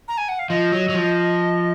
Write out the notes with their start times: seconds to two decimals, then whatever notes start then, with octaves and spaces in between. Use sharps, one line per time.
0.08 A#5
0.18 G#5
0.28 F#5
0.39 F5
0.50 F3 D#5
0.72 F#3
0.89 F#3
0.94 F3